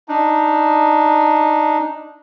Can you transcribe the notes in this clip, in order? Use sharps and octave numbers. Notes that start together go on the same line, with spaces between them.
D4 D#4